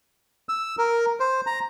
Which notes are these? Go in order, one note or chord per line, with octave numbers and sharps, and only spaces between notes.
E6
A#4
C5
A#5